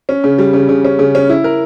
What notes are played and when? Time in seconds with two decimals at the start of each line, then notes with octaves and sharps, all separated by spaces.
0.09 C#4
0.24 C#3
0.39 G3
0.53 C#3
0.69 C#3
0.85 C#4
0.99 C#3
1.15 C#4
1.29 E4
1.44 A#4